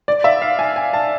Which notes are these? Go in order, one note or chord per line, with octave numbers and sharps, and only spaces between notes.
D5
E5
F5
G#5
G#5
A5